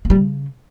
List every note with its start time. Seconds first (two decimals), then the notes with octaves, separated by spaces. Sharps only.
0.05 A#3
0.10 G3
0.15 C#3